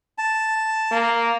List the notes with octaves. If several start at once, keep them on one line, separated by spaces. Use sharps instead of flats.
A5
A#3